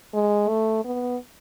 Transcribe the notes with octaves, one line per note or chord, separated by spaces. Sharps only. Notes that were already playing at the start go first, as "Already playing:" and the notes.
G#3
A3
B3